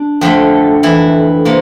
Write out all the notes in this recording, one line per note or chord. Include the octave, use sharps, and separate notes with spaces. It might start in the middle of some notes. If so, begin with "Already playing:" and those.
Already playing: D4
F2 D3 A3
E3 E4
C3 A#3